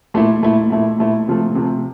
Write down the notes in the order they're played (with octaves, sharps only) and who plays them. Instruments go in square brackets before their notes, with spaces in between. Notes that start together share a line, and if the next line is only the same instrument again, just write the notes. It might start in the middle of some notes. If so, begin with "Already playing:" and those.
[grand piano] A#2 A3 E4
A#2 A3 E4
A#2 A3 E4
A#2 A3 E4
C3 F3 A3
C3 F3 A3